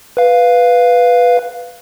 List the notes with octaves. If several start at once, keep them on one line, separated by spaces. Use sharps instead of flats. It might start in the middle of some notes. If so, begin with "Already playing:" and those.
B4 F5